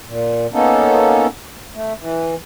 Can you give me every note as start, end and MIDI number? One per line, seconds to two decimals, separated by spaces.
0.07 0.47 46
0.53 1.27 58
0.53 1.27 59
0.53 1.27 61
0.53 1.27 63
0.53 1.27 69
1.74 1.93 57
1.99 2.35 52